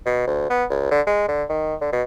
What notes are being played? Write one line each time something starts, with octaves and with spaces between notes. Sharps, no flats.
B2
D2
B3
C#2
D3
G#3
D3
D#3
D3
B2